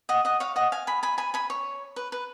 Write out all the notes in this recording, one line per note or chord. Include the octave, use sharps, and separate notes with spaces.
D#5 F#5
D#5 F#5
C#5 F5
D#5 F#5
F5 G#5
G#5 B5
G#5 B5
G#5 B5
G#5 B5
C#5
B4
B4